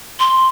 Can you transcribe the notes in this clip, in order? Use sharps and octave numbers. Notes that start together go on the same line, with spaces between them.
C6